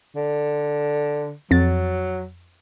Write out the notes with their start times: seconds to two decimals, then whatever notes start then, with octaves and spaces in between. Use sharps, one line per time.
0.15 D3
1.51 F2 F#3 A6